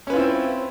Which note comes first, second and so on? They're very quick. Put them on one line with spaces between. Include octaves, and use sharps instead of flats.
C#4 B4 F4 E4 C4